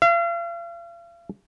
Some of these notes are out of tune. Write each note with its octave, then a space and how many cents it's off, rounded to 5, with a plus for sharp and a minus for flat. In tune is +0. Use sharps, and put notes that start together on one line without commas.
F5 -40